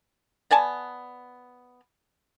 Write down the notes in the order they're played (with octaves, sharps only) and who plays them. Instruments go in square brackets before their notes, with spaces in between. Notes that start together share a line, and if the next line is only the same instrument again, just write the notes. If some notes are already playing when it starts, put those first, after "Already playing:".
[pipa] B3 D5 G#5 A5